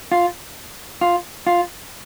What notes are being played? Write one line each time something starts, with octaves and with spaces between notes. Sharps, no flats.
F4
F4
F4